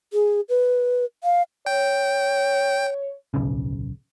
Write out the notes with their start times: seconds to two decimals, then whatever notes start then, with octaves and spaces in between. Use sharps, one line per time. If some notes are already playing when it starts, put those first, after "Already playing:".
0.13 G#4
0.49 B4
1.24 F5
1.66 C#5 G5
3.34 D1 B1 C#3